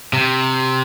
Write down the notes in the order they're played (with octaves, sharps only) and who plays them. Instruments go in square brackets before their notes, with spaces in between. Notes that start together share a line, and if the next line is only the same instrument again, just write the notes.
[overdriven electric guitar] C3